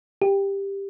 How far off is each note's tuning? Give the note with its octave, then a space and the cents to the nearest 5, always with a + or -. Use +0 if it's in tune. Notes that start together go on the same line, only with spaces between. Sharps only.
G4 +10